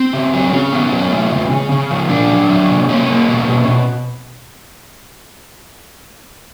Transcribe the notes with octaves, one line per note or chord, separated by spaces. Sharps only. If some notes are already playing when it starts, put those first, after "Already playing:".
Already playing: C4
C#3
F#3
C#3 C#4
B3
F#3
A3
C#3
C#3
C#3
F3
A#2 D4
F#3
F#3
C3
A#3 C#4
A#3
B2
B2
B2